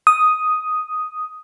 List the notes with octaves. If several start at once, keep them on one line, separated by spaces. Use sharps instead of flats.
D#6